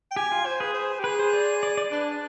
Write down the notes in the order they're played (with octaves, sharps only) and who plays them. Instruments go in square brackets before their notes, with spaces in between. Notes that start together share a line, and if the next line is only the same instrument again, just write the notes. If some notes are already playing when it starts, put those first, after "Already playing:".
[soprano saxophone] G5
[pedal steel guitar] G4 [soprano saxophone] G#5
[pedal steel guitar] F4
[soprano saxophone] C5
[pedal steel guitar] G#4 [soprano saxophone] B4
[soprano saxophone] C5
G4
[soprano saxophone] G#4 [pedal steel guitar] B4
[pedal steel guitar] C5
D5
D5
D5
[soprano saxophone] D4 [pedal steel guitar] B4